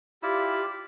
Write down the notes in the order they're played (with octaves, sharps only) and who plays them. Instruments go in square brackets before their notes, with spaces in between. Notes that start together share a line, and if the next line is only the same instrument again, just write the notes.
[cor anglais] E4 [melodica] F4 D5 F5 [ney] G4